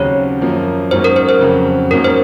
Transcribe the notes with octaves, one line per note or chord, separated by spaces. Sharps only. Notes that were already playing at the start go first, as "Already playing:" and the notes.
Already playing: D#2 C#3 F#3 C4 C#5
F#2 F3 A#3
G#2 F#3 A#3 C#4 C5
A#4
C5
C5
F2 C#3 F#3
G#2 F#3 A#3 C#4 A#4
C5